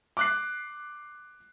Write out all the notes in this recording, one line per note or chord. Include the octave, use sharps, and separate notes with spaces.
D6 F#6 C7